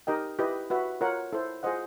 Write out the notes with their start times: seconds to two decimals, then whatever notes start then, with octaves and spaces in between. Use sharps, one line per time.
0.07 D#4 G4 A#4 D#5 G5
0.39 E4 G4 B4 D#5
0.70 F#4 B4 E5
1.01 F4 A#4 C#5 F#5
1.33 E4 A4 C5
1.63 F4 G#4 C5 D#5 F#5